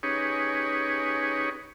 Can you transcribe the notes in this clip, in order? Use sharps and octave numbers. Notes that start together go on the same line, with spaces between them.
C#4 D#4 G4 G#4 B4 C#5